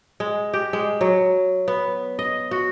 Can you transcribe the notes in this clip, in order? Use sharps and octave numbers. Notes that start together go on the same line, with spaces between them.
G#3
G4
G#3
F#3
B3
D#5
F#4